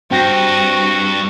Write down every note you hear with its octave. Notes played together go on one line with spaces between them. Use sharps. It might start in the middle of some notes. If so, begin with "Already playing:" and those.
G2 C4 F#4 G5 A#6